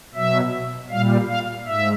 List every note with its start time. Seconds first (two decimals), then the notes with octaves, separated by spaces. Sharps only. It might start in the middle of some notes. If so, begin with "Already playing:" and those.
0.14 B2 F#3 E5
0.90 A#2 G3 F5
1.28 F5
1.66 G#2 E5